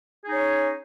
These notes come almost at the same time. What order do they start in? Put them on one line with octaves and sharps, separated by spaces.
G#4 D#4 C#5 C#4